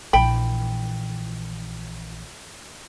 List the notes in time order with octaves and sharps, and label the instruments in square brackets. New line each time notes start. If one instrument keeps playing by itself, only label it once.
[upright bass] A#1 E3 [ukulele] G5 B5